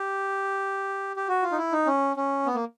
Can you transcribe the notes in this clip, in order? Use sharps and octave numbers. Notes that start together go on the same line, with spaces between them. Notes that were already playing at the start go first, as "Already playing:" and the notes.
Already playing: G4
G4
F#4
F4
D#4
E4
D#4
C#4
C#4
B3
A#3